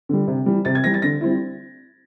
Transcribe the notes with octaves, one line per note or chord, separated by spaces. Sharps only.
D3 G3
C3
E3 G3
C3 A6
G#6
E3 G3 A#6
A6
D3 A#6
G3 C4 E4